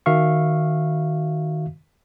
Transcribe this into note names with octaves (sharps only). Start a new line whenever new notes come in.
D#3 F#4 E5 F5 C#6